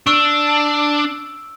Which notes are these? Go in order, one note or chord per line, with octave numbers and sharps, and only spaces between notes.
D4 C#6 E6 D7